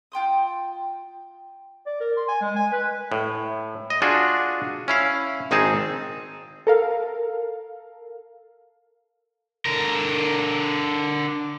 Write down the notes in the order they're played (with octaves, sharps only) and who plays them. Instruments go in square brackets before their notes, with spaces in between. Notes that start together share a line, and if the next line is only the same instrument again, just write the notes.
[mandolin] F4 G5 C6 D#6
[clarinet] D5
A#4
C6
G#5
G#3
G#5
B4
[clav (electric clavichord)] A2
D#5
D4 F4 F#4 G#4
C#4 E4 F5
G#1 C4 D#4 G#4 A5
[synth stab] A4 A#4 F5
[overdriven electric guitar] D3 A#4